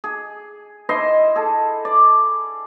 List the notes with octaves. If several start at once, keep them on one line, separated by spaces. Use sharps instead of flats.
G#4
E4 C5 D#5 C6
G#4 A4
D5